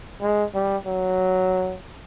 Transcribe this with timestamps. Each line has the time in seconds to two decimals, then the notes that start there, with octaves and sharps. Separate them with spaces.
0.22 G#3
0.54 G3
0.86 F#3